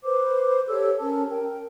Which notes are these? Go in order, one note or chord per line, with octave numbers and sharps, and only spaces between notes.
B4 C5 D6
G4 A4 C#5 E6
C#4 A#4 A5
A#4 G5